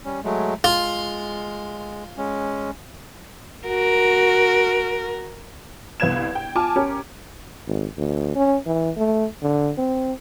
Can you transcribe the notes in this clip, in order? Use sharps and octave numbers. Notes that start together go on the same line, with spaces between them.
G3 C#4
F#3 G#3 A3
G#3 F4
G#3 C#4
F#4 A#4
G1 C2 B4 F5 G#6 E7
G5
F4 G#5 A5 D6 F6
C#4 G4 A#4
G#1
D2
C#4
E3
A3
D3
C4